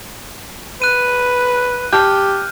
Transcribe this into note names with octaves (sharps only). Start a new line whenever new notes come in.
B4 F#6 D#7
G4 A5 F6 G6